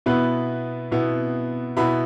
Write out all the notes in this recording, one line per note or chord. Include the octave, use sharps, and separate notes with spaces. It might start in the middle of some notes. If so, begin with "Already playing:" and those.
B2 B3 E4 B4
B2 B3 E4
B2 B3 E4 B5